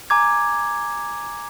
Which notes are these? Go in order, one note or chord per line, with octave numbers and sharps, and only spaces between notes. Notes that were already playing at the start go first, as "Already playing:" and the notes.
G#5 A#5 D6 G#6